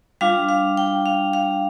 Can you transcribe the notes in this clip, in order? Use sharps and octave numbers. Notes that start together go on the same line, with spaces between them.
G3 D4 F4 F5
F5
G5
F5
F5